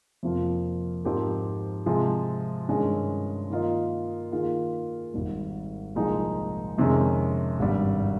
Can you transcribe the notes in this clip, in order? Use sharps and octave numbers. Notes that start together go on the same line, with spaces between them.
F2 C3 F3 A#3 F4
G#2 F3 C4 G4 A#4
C3 F3 G#3
G2 D#3 G#3 C#4
D#3 A#3 F4 A#4 D#5
D#3 A#3 F4 G#4
G#1 G#2 G3
C2 A#2 F3 G#3 D#4
F2 C3 D#3 G#3 C#4
G#1 G2 G3